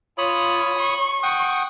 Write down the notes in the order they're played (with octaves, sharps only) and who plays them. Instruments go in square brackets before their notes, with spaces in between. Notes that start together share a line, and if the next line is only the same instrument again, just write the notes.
[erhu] F4 [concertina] C#5 B5 D#6
[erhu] C#6
[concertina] F#5 G5 D#6 [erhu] C#6